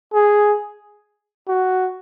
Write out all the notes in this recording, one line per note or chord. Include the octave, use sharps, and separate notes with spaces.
G#4
F#4